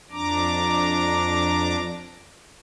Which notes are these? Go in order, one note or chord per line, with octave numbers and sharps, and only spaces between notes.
F2 D4 A#5 D6